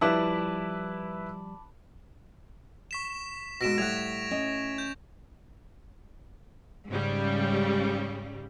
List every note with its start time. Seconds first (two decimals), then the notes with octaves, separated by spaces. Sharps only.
0.01 F3 G3 E4 B4 A5 B5 D6
2.91 C#6 B6 E7
3.61 G#2 B2 A#6 D7 E7
3.78 A2 G3 F#5 G#6 F7
4.31 C#4 D#5
4.78 G6
6.89 G#2 C#3 G3